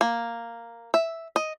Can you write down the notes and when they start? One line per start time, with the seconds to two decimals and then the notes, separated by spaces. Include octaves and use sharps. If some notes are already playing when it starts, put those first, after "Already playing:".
0.01 A#3
0.94 E5
1.36 D#5